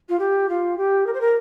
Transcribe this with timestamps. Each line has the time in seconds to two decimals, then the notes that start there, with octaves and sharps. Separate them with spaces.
0.09 F4
0.19 G4
0.49 F4
0.77 G4
1.06 A#4
1.13 C5
1.20 A#4